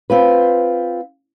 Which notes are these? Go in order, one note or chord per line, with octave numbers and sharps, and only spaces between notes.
C4 F4 B4